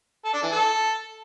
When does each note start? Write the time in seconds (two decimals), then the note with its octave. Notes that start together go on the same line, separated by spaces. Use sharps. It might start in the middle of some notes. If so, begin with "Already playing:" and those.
0.25 A4
0.34 D4
0.43 E3
0.52 A4